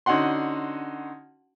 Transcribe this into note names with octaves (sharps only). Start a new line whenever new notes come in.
D3 C#4 D#4 F#4 F#5 C6